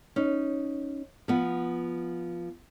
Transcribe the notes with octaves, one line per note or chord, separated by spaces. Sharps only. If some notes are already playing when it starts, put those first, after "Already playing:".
C#4 D#4
F3 B3